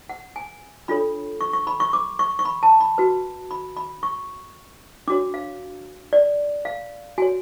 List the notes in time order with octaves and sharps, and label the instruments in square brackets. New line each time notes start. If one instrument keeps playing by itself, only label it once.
[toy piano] F#5
G#5
D4 F4 A4 C#5 B5
C#6
C#6
B5
C#6
D6
C#6
C#6
B5
A5
B5
F#4 B4
B5
B5
C#6
D4 F#4 C#5 D6
F5
D5
F5
F#4 C#5 G#5